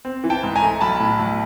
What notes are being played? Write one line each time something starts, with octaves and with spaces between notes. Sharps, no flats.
C4
E3
G5 A5
G#2
G#5 A#5
A3
B1 A5 B5
A2
B1